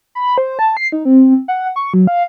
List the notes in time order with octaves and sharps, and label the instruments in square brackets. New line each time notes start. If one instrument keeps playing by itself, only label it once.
[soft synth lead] B5
C5
A5
C7
D#4
C4
F#5
C#6
F#3
F5